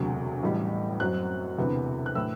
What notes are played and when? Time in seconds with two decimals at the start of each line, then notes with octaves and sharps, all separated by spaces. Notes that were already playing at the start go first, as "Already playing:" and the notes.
Already playing: E1 D2 C3 F#3
0.43 A1 A2 E3 G3
1.00 F#2 F#3 C4 F#6
1.58 E1 D2 C3 E3 B3
2.06 F#6
2.15 A2 E3 E6